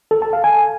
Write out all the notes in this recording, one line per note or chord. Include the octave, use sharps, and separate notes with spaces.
A4
A5
F5
G#5